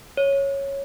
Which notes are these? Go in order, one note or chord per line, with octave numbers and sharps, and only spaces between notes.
C#5